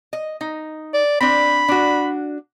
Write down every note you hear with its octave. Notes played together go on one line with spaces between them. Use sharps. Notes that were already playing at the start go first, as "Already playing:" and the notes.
D#5
D#4
D5
C4 D4 B5
D4 F#4